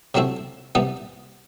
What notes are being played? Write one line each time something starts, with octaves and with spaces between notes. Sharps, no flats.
C3 F#3 A3 C4 E4
C3 E3 G3 B3